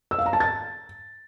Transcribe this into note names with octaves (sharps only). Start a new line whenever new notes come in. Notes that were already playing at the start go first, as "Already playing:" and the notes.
E6
F5
A#5
A5
A6